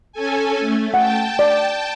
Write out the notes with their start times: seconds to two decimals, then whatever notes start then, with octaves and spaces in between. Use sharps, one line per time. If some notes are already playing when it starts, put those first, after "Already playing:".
0.12 C#4 A4 G#5
0.59 A3
0.94 F#5 G5 A5
1.39 D5